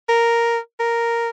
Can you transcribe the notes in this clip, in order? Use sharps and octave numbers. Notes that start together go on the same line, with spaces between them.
A#4
A#4